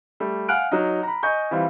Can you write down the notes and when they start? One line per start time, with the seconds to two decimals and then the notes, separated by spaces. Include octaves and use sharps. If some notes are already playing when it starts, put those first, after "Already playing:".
0.20 G3 A3
0.49 F5 F#5 G#5 F6 F#6 D7
0.72 F#3 D#4
1.03 A#5 B5
1.23 D#5 G#5 C#6 G6
1.51 E3 G3 C4 F4